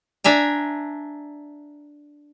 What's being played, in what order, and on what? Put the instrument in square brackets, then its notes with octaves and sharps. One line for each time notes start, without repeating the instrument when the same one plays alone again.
[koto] D4 E5 G#5 A#5